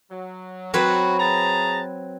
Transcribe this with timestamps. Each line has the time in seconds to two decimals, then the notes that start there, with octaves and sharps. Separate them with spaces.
0.11 F#3
0.74 F#3 C4 F#4 B4
1.20 G#4 A5 A#5